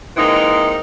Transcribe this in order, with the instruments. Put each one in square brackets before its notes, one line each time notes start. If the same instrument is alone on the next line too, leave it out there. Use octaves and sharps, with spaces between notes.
[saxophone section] C3 E3 G#3 A#3 D#4